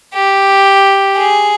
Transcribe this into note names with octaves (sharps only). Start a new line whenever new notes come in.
G4
G#4